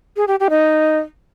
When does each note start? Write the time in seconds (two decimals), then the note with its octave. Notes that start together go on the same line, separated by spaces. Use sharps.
0.17 G#4
0.28 G4
0.40 G4
0.50 D#4